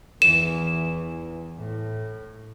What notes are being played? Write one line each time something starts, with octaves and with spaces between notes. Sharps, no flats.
E2 E3 E7
A2